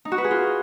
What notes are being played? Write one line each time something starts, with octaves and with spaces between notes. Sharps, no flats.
D#4
F#4
B4
G#4
F4